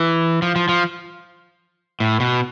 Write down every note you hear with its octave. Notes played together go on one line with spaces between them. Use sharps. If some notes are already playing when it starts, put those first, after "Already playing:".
Already playing: E3
F3
F3
F3
A2
B2